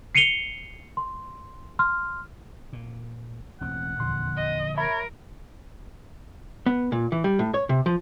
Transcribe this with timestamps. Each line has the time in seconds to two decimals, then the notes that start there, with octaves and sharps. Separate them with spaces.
0.15 C7 C#7 D#7 F7 G7
0.97 C6
1.79 C6 F6
2.73 A#2
3.61 E1 A1 C4 F#5
4.00 E2 A#2 D3 F3 C6
4.36 D#5
4.78 A#4 C#5 E5 B5
6.66 B3
6.92 A#2
7.12 E3
7.24 G3
7.39 A2
7.54 C#5
7.69 C3
7.86 F3